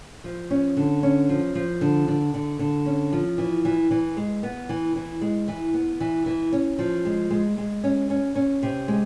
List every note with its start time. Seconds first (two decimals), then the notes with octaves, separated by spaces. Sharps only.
0.24 F3
0.51 C#4
0.77 D3
1.03 C#4
1.29 F3
1.55 F3
1.81 D3
2.08 D3
2.34 D3
2.59 D3
2.86 C#4
3.12 F3
3.38 E3
3.65 E3
3.91 E3
4.17 G#3
4.43 B3
4.69 E3
4.96 E3
5.21 G#3
5.48 E3
5.74 B3
6.00 E3
6.26 E3
6.53 C#4
6.79 F3
7.05 G#3
7.31 G#3
7.58 G#3
7.84 C#4
8.10 C#4
8.36 C#4
8.63 C3
8.88 G#3